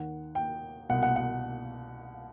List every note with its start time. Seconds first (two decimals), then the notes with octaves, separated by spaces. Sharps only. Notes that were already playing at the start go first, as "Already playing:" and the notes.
Already playing: D#2 D#3 F#5
0.35 G5
0.89 C2 B2 F#5
1.03 F#5
1.16 F#5